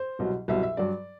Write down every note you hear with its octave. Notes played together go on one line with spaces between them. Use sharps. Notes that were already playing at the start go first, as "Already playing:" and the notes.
Already playing: C5
C2 B2 F#3
C2 B2 F#3 E5
E5
G2 F#3 D5